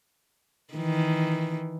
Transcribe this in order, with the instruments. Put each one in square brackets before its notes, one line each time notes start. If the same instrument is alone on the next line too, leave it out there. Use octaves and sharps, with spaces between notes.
[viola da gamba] D#3 E3